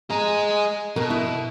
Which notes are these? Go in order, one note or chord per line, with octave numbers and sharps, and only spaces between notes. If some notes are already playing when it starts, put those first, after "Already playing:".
G#4 D#5 A#5
B2 A#4
E4